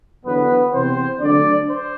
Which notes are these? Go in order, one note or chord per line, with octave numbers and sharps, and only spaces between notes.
E2 D3 F#3 B3 B4
E2 C3 E3 C4 C5
D2 D3 F#3 D4 D5
C5